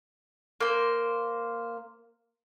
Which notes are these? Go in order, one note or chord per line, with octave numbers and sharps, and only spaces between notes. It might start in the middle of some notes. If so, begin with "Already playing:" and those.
A#3 C5